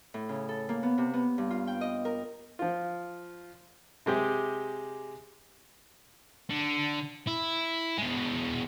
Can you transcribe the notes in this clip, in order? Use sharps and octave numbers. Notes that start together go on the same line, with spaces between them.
A2
C#3
A4
A#3
B3
C3
B3
G2
F4
G5
D#5
A#4
F3 F4
C3 G#3 G4
D3
E4
B2 G#3